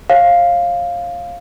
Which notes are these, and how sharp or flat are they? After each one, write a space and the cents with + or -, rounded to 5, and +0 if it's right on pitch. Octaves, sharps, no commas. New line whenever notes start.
C#5 -25 F5 +0